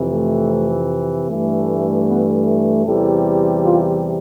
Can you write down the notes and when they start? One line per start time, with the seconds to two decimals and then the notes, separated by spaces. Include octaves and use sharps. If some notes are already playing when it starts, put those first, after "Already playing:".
Already playing: F2 C3 E3
0.10 A3
1.28 G2 E3 A3
2.07 B3
2.46 A4
2.86 E2 C3 E3 G3 A4
3.65 F4